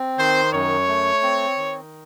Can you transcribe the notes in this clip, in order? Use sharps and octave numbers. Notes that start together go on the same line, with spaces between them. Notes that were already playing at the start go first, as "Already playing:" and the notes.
Already playing: C4
D#3 C5
F#2 C#5
A3
C4
D#3